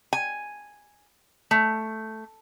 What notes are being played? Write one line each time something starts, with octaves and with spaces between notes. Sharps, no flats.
G#5
A3